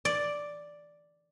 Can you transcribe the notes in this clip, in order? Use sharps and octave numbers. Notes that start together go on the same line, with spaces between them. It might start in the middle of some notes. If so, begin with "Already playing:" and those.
D5